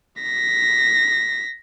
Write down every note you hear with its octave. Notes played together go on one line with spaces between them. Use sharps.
A#6 B6